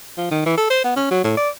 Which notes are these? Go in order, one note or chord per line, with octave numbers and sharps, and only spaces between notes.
F3
D#3
E3
A4
C5
B3
C#4
F#3
A2
D5